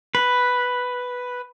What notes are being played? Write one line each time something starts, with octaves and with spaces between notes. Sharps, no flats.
B4